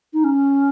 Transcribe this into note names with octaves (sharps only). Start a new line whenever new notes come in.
D#4
C#4